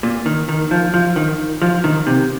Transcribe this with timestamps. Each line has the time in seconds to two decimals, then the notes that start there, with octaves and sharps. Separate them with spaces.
0.03 A#2
0.26 D#3
0.49 D#3
0.71 F3
0.94 F3
1.16 D#3
1.62 F3
1.84 D#3
2.07 C3